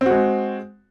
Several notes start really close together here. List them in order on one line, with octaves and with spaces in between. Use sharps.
C4 F#4 G#3